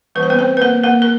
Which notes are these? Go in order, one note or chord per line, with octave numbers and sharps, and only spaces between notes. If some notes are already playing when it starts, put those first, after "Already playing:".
E3 G3 A#3 C#4 B4
C5
B3 B4
C4 C5
B4
A#3 A#4
A#3 A#4
A#4